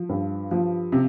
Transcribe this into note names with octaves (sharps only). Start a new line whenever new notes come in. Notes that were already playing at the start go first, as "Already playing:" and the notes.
Already playing: F3
G2
F3
C3